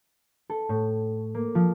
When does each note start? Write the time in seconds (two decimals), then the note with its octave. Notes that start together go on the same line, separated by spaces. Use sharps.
0.50 A4
0.69 A2
1.34 A#3
1.55 F3